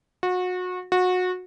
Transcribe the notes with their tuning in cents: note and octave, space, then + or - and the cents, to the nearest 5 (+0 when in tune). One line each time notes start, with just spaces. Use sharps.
F#4 -30
F#4 -25